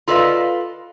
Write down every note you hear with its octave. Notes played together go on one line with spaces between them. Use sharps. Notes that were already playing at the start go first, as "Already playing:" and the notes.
F4 A4 B4 D5 D#5 F5